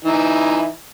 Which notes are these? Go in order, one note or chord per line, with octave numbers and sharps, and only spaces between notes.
E3 D#4 E4